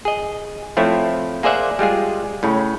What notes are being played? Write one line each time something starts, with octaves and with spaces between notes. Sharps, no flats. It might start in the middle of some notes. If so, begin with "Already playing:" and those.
G#4 D#5
F3 A3 C4 E4 C#5
A#3 G#4 C5 D5 E5 F#5
G3 G#3 F4 G#4
A2 C#3 C#4